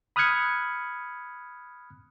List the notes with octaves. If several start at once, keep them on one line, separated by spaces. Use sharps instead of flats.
B5 D#6 F6 F#6 G#6 C#7